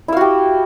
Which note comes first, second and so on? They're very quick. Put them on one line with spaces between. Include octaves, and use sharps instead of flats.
E4 F5 F#4 G4